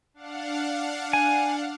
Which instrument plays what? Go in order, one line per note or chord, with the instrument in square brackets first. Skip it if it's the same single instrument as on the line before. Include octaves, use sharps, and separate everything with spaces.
[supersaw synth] D4 F5 F#5
[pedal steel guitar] G#5